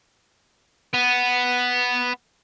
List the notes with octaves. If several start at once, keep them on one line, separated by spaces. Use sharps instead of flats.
B3